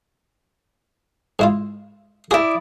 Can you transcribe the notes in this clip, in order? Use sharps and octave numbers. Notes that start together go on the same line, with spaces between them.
G#2 E4 F4
E4 F#4 G#4 D5 D#6